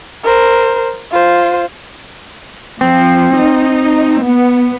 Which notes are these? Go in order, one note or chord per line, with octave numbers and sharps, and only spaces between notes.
A#4 C5
F4 C5
F3 C4
D#4
B3